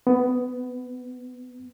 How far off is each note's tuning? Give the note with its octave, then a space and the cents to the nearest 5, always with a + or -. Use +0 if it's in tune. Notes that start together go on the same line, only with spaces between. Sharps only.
B3 +20